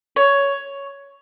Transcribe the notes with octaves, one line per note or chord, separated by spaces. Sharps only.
C#5